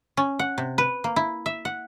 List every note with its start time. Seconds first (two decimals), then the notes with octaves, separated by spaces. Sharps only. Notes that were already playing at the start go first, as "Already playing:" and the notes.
0.17 C#4
0.39 F#5
0.58 C3
0.78 B4
1.04 A#3
1.16 E4
1.46 E5
1.65 F#5